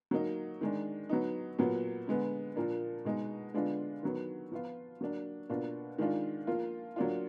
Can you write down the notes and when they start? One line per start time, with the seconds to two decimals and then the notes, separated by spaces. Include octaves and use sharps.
0.11 F#3 A#3 D#4
0.61 D#3 G#3 D4
1.09 F#3 B3 D#4
1.58 A#2 F#3 B3
2.07 D3 G#3 B3
2.56 A#2 F3 A#3 D4
3.05 B2 G#3 D#4
3.54 D3 G#3 B3 D4 F4
4.03 D#3 F#3 B3
4.52 F3 B3 F4
5.01 F#3 A#3 D4
5.49 B2 A#3 D4 F4
5.98 D#3 G#3 D4 F4
6.47 F3 A#3 F4
6.96 F#3 A#3 D4 F4